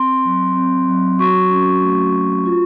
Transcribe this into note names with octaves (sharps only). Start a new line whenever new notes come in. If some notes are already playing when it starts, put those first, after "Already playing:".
Already playing: C4 C6
F#3
C4
F#3
F#4 C#6
C#4
A3
F#4
F4